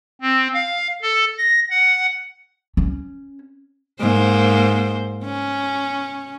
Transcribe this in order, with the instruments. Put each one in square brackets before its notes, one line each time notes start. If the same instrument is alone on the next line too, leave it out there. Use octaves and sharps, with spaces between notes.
[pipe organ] C4
F5
A4
A#6
F#5
[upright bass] C#4
[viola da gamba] G#2 A#3 C5
C#4